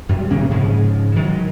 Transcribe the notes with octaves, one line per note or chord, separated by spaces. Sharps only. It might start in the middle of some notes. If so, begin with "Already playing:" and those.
F#2 G3
C3 D#3 A#3 C#4
G#2 C#3 F3 G#3
D#3 F#3 G#3